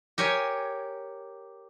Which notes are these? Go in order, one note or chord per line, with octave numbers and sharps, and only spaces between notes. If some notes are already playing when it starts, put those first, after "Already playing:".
G4 A#4 C#5 G#5